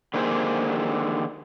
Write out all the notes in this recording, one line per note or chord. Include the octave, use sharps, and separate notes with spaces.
D3 D#3 A#3 G4 G#4 C5